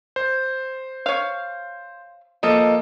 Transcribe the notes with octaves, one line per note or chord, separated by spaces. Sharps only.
C5
C#5 F5
F3 A#3 A4 D#5